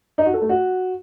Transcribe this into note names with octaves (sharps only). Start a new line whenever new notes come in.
D#4
F#4
A4
A3
F#4